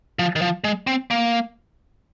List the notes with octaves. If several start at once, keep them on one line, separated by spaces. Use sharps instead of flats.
F3
D#3
F3
G#3
C4
A#3